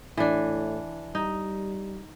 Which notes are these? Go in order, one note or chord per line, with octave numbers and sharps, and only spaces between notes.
A2 E3 D4
G3 D#4